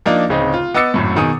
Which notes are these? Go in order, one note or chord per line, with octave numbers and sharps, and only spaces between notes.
F3 A#3 D4 D#4 D5
D1 C#3 C4 D#4
F4
B3 D#5 D6 E6 A6 C#7
G#1 F#2 A2
B2 D#3 G#4 D#6